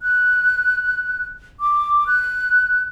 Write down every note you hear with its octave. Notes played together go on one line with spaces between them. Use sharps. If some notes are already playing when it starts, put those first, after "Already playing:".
F#6
D6
F#6